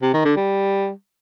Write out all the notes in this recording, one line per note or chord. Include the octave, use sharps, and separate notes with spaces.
C3
D#3
D3
G3